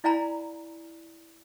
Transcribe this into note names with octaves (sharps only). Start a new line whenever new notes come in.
E4 D5 F5 G#5 A#5 B5